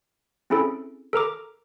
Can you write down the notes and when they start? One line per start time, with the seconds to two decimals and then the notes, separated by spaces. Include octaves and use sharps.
0.50 C4 C#4 E4 G#4 A4
1.13 A4 A#4 A#5 D6